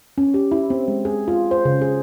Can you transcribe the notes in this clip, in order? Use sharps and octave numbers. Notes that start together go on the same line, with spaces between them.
C#4
G4
E4
C4
G#3
G#4
F4
C5
C#3
G#4